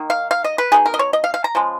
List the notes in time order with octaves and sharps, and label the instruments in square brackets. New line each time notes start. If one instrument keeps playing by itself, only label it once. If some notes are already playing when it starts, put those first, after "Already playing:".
Already playing: [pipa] D#3 A#3 D#4
F5
F5
D#5
B4
B2 A#3 D#4 G#4
A#4
D#5
C#5
D#5
F5
F5
A#5
C#3 F3 G#3